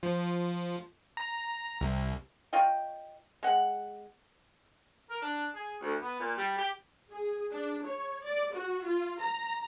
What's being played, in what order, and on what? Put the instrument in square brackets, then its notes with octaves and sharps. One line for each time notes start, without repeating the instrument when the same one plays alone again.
[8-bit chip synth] F3
A#5
C2
[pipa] F4 C#5 D#5 G5
G#3 F#5
[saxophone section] A#4
D4
G#4
D2
B3
A#2
G3
G4
[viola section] G#4
D4
C#5
D5
F#4
F4
A#5